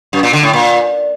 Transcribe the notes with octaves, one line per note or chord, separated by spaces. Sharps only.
F#2
A#2
D3
A2
A#2